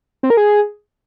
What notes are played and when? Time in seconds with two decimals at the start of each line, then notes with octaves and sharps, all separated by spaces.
0.23 C4
0.30 A#4
0.37 G#4